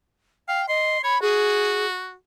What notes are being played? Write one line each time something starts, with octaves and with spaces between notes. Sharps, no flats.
F5 G5
D#5 C6
C#5 B5
F#4 G#4